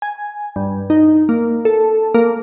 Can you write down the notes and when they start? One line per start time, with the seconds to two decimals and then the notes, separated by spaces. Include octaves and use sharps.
0.02 G#5
0.56 G2
0.90 D#4
1.29 A#3
1.65 A4
2.14 A#3